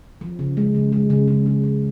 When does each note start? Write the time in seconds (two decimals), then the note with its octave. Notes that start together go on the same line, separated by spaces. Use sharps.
0.21 F3
0.39 C#3
0.57 G#3
0.75 C#3
0.92 G#3
1.10 C#3
1.28 C#3
1.46 C#3
1.64 C#3